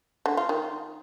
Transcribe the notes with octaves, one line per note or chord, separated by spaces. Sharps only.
D3
F4
D#3